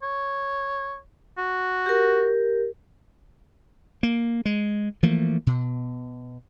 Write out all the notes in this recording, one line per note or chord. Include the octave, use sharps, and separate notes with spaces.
C#5
F#4
G4 A#4
A#3
G#3
E3 F3 A3 A#3
B2